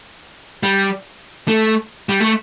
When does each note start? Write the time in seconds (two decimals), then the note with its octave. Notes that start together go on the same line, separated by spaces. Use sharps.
0.63 G3
1.48 A3
2.09 G3
2.20 A3